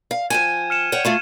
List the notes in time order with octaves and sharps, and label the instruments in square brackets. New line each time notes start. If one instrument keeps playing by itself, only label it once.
[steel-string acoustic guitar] F5
[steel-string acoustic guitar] F3 G5 G#5 [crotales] G#6 D#7 E7
[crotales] F6 C#7 E7
[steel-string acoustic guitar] C#5 F#5 G5
A3 F4 F5